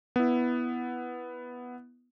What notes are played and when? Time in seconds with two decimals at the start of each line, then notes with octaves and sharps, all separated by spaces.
0.16 B3 E4